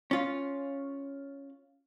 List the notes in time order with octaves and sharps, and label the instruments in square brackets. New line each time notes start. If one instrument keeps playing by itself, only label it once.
[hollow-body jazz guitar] C#4 F4